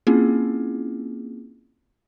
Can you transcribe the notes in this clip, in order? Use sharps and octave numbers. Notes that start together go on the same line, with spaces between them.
A#3 C4 C#4 E4 F4 G#4